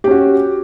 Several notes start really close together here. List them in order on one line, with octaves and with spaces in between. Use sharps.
G4 C#4 F#4